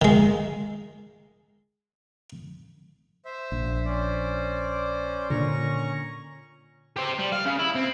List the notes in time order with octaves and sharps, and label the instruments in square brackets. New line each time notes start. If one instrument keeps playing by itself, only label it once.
[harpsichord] D#3 G#3
[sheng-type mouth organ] C5 E5
[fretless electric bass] A#1
[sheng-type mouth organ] C#4 C5 D5
[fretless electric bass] A#2 D3 [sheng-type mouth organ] C#4 A#5 C#6
[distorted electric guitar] G4 C5
G3
F5
C#3
E4
C4